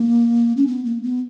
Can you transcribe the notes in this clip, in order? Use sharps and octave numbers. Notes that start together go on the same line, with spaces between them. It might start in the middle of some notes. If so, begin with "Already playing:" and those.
Already playing: A#3
C#4
B3
A#3
B3